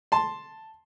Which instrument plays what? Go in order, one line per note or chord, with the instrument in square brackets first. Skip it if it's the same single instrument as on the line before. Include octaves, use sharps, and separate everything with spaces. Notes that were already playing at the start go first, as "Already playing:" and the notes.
[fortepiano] A5 C6